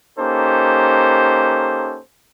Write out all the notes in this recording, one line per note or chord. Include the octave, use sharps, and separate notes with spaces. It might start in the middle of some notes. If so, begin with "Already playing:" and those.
A#3 C#4 D#4 G4 A4 C5